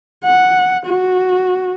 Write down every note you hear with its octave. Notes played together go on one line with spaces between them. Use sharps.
F#5
F#4